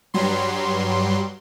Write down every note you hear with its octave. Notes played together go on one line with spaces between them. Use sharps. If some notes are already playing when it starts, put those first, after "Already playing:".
G2 F#3 G3 C6